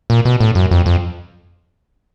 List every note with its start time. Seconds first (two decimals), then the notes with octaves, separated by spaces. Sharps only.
0.10 A#2
0.25 B2
0.40 A2
0.55 F#2
0.71 F2
0.86 F2